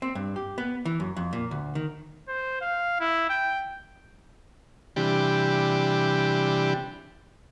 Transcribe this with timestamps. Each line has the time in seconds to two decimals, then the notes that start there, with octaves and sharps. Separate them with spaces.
0.02 C4
0.15 G2
0.36 G4
0.58 B3
0.85 E3
1.00 F#2
1.17 F2
1.33 A#2
1.51 D2
1.75 D#3
2.28 C5
2.61 F5
3.00 E4
3.30 G5
4.96 C3 E3 G3 D4 G4